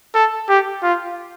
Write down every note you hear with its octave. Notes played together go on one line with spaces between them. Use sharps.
A4
G4
F4